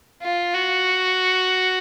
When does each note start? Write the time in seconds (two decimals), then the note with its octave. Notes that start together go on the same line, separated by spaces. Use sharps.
0.22 F4
0.54 F#4